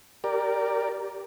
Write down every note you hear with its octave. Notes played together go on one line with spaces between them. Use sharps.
G4 A#4 D5